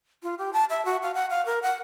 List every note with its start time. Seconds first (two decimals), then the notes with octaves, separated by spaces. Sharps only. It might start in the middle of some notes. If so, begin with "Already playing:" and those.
0.23 F4
0.39 G4
0.53 A5
0.70 E5
0.85 F#4
1.03 F5
1.14 F#5
1.30 F5
1.46 A#4
1.63 F#5